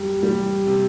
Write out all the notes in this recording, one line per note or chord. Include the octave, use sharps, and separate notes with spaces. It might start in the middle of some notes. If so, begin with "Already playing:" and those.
Already playing: F#2 G3
G3
C3